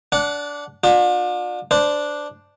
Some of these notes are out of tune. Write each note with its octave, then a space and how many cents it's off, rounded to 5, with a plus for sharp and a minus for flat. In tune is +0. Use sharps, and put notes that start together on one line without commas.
D4 -15 F#5 +0
D4 +30 F4 +45
D4 +0 C5 -15